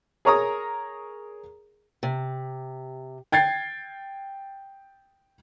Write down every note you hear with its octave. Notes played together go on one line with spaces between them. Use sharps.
G#4 A#4 C#5 A#5 D#6
C3
G5 G#6 A6 C7